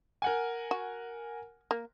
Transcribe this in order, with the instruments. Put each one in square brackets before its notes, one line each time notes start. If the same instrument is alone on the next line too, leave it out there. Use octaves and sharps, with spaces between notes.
[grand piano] A#4 F#5 G#5
[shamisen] F#4
A#3